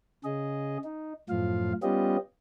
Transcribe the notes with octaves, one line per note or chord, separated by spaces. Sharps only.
C#3 G#4 D#5
D#4
F#2 A2 F3 F4 F5
G3 B3 C#4 F4 G4 D#5